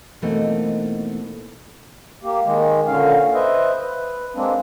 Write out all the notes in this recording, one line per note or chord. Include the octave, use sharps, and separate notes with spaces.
B2 E3 A3 A#3 C4 D#4
A#3 G4
D#3 G#3
A#2 D3 C#4 F5
B4 C5 D#5 E5
B4
G#3 A#3 C4 D4